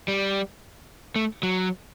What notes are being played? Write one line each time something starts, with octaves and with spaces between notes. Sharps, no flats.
G3
A3
F#3